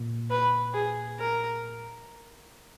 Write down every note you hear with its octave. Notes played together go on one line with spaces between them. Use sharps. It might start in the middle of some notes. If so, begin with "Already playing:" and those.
Already playing: A#2
B4
G#4
A#4